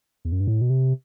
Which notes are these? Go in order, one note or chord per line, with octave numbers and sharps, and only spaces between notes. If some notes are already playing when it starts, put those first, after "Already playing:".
E2
F#2
G2
A2
B2
C3